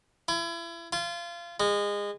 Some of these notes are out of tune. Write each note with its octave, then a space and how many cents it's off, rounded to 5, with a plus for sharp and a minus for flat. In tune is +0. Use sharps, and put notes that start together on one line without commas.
E4 +35
F4 -25
G#3 -25